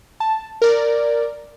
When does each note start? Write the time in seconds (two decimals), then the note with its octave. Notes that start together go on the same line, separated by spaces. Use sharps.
0.20 A5
0.62 A#4 D5